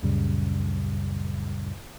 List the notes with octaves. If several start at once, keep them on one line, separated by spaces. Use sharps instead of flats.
C#2 F#2 A#2 C#3 G3